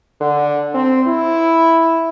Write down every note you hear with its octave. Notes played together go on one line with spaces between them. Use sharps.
D3
C4
E4